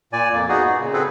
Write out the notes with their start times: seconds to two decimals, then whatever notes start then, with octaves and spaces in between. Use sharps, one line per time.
0.13 A#2 D5 G#5
0.33 F2 A#3
0.49 B3 D#4 F#4 G#4
0.65 G#2
0.80 A#2 C#3
0.93 C4 G#4 A4 B4